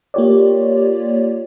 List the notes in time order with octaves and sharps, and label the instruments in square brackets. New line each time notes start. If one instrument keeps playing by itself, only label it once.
[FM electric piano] A#3 F4 G4 C#5 D5